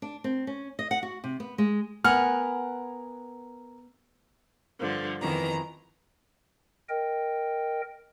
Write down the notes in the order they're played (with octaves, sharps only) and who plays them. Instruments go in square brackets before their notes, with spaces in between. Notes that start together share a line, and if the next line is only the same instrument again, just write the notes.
[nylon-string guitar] D4
C4
C#4
D#5
F#5
F#4
C3
B3
G#3
[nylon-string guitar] B3 [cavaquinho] A#4 F#5 G#5 [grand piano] F6
[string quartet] G2 D3 F3
F2 D#3 E3 B3 A#5
[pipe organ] A#4 D#5 G5